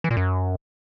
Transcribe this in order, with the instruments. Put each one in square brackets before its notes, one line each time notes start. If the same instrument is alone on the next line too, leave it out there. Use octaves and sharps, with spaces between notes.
[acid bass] E3
A#2
F#2